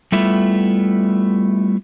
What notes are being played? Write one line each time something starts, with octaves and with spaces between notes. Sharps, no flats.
G3 A3 B3 E4 F4